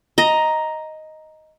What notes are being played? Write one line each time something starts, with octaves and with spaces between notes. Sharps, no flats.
D#5 A#5